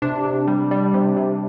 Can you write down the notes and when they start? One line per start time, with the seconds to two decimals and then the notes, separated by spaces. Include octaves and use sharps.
0.02 C3 D4
0.25 C3
0.48 G3
0.71 G3
0.94 C3
1.17 C3